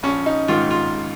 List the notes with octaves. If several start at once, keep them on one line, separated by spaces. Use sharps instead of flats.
A#1 C#4
D#4
G#2 D#3 F4
F4